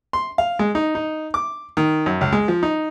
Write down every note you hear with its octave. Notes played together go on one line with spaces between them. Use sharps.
C6
F5
G#3
D#4
D#4
D6
D#3
F#2
C#2
G#3
F3
D#4